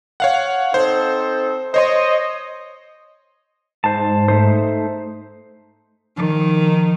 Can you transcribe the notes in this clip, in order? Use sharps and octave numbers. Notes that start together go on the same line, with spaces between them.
C#5 F5 F#5
C4 D#4 A4 C5
C5 C#5 D#5 C6
G#2 C5 A5
A3 D#4 C5
D#3 F3